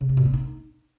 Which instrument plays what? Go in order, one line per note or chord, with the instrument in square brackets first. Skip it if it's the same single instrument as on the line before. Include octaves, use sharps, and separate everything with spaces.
[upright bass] C#3
C3
A#2
C4
D#4